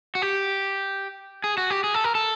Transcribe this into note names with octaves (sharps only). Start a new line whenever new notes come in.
F#4
G4
G#4
F#4
G4
G#4
A4
A#4
A4